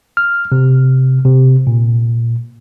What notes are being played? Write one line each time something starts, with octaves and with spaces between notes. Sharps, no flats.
F6
C3
C3
A#2